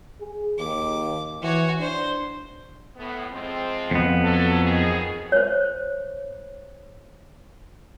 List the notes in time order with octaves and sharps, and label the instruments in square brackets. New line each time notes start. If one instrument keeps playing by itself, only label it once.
[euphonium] G#4
[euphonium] D#2 [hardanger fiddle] D6
[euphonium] E3 [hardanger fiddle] F#4 C#5
[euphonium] D4 [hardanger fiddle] C5
[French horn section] A2 B3
F3 G#3 C4
[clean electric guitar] F2 B3
[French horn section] F#3 A4
B2 D#3 G#4
[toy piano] C5 C#5